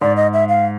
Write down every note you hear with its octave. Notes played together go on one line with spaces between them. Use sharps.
G#2 D5
D#5
E5
F5